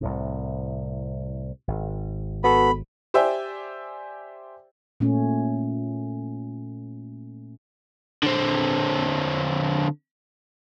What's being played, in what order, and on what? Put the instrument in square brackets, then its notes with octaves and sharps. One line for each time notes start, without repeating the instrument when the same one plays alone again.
[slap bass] C2 A2 C3
G#1
[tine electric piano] B3 F#4 A4 [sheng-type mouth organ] B5
[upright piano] G4 C5 D5 E5 G5 G#5
[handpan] A#2 A3 C#4
[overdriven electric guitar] D3 C4